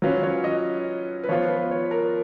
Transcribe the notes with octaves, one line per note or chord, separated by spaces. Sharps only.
F#3 C#4 F4 B4
C#5
D#5
B4
F3 B3 F4 C#5
B4
C#5
A#4